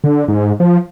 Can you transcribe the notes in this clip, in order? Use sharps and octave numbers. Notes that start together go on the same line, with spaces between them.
D3
G#2
F3